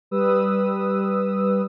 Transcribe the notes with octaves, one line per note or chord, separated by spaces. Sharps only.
G3 B4 D#6 E6